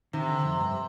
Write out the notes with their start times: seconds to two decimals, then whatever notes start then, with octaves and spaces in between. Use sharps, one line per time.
0.13 C3 D#3
0.29 D3
0.44 F2
0.60 G2